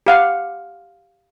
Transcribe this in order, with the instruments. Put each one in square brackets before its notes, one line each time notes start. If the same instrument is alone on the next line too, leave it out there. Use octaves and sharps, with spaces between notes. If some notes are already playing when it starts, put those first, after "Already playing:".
[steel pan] G4 F5 F#5